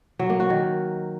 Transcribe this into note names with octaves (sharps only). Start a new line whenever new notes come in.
F#3
A#3
F#4
D#3